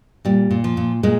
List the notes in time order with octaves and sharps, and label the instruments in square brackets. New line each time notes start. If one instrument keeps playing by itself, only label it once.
[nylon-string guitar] A#2 G3
A#2
F3
A#2
A#2 G#3